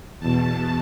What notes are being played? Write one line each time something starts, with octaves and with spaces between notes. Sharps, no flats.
E2 B2 A5